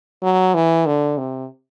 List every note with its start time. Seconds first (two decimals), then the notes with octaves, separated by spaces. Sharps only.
0.23 F#3
0.54 E3
0.86 D3
1.18 C3